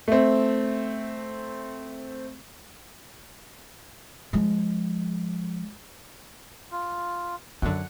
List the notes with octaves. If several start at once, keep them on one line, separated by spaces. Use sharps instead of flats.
A3 C4
F3 G#3
F4
F#2 D3 F#3 F#5